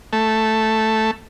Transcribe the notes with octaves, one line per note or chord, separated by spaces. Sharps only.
A3